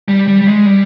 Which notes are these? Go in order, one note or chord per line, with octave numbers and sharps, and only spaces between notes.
G3
G3
G3
G#3
G3